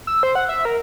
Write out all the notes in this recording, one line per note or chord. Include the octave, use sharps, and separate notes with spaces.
E6
C5
F#5
E5
A#4